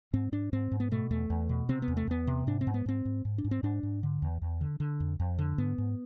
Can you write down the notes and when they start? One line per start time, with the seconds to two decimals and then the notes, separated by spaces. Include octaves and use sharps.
0.13 G#2 C4
0.32 G#2 D4
0.53 G#2 C4
0.71 G#2
0.80 B3
0.91 B2 A3
1.10 E2 A3
1.30 E2
1.49 B2
1.69 C3 C4
1.82 B3
1.88 E2
1.97 A3
2.07 E2 B3
2.27 C3
2.47 G#2 D4
2.61 C4
2.67 G#2
2.74 B3
2.86 G#2 C4
3.05 G#2
3.25 G#2
3.38 D4
3.44 G#2
3.51 C4
3.63 G#2 D4
3.83 G#2
4.03 D3
4.22 E2
4.42 E2
4.61 D3
4.80 D3
5.00 F2
5.20 F2
5.38 D3
5.58 G#2 B3
5.78 G#2